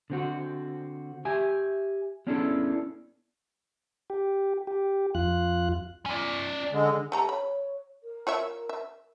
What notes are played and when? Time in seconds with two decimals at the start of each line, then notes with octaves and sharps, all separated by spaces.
0.10 D3 C4 F#4
1.25 G4 E5 G#5
2.27 B3 C#4 D4 E4 G#4 A4
4.10 G4
4.67 G4
5.15 F2 F4 F#6
6.06 C#4 D5
6.72 D3 G#3
7.12 A3 G4 A4 A#5
7.29 C#5 B5
8.03 A#4
8.27 F4 C#5 E5
8.69 E5